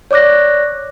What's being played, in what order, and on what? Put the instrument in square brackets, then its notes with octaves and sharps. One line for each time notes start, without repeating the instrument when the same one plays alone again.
[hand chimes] C#5 D5 D6 F#6 A#6